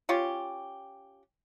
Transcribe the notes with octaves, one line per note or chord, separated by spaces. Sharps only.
C#4 F4 G4